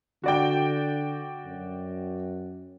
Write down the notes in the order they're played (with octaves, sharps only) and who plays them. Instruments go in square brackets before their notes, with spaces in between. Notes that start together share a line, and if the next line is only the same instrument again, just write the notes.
[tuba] D3 [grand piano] F#4 D5 G5
[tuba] F#2